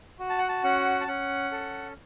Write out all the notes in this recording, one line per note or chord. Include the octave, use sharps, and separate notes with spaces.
F#4
A5
F#5
A5
C#4 F#5
A5
C#4 F#5
A4